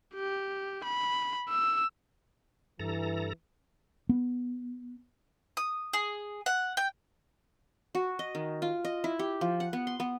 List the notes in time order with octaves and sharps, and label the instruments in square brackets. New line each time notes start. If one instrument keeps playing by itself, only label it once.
[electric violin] G4
B5
E6
[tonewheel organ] G2 A4 A#5 [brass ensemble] E3
[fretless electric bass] B3
[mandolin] D#6
G#4
F#5
G5
[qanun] F#4
D#5
D#3
F4
D#5
E4
G4
F3
F#5
B3
C6
B3